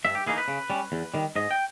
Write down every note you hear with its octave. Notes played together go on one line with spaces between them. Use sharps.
G2 E5
G4
E3 A#3 D#4 G#4
B4
C#3
G3 C#4
E2
D#3 G3
G#2 D#5
G5